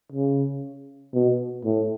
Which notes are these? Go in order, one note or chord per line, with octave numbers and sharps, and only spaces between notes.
C#3
B2
A2